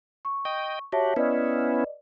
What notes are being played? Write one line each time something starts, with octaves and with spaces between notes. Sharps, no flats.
C#6
D#5 G5
F#4 G4 C#5 E5 A5
B3 C#4 E4 B4 D5 D#5